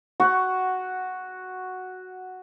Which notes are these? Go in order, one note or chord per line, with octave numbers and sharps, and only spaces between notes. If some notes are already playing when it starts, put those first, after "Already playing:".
F#4 F#5 C#6